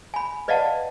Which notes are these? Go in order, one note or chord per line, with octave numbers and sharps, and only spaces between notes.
G#5 B5
B4 D5 D#5 F5 F#5 A5